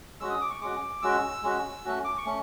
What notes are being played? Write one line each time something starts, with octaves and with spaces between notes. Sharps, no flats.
G#3 C#4 F#4 E6
D#6
D6
C#6
G#3 C#4 F#4 D6
G#3 C#4 F#4 E6
G#3 C#4 F#4
A3 C#4 F#4
D6
C#6
A3 C#4